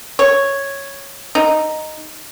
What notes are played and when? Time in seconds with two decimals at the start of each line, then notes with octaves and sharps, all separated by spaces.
0.19 C#5
1.35 D#4